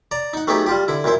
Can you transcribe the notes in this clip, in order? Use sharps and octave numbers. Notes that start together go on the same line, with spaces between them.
D5 A#5
D#4 F#5
F#3 A3 B3 D#4 G4 G#4
G3 F4 G4
D3 E4
F#2 A#2 E4 C5